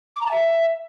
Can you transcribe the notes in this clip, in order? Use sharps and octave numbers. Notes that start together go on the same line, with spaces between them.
D6
A#5
A5
E5